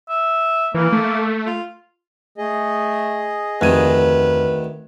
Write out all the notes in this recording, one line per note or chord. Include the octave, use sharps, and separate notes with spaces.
E5
E3 A#3
A3
F4
A3 G#4 D#5
F1 D2 D#3 B4 G#6 D#7